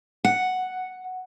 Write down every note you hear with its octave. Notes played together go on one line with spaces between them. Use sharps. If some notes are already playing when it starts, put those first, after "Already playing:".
F#5